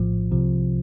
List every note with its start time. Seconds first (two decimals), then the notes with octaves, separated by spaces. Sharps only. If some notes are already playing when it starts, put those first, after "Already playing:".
Already playing: A#1 A2 F3
0.31 C2 C3 F3